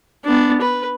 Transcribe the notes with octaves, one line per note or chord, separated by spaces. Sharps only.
B3 D4
B4